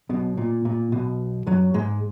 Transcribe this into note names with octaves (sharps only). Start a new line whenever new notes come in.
B1 B2
A#2
A#2
B1 B2
F#2 F#3
G#2 G#3